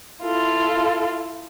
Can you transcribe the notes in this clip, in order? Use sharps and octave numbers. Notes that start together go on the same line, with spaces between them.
E4 F4 A4